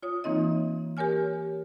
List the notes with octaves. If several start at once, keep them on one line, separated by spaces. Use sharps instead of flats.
F4 C#5 D#6
E3 A#3 C4 D#4 D#5
G4 A#4 C#5 G#5 F6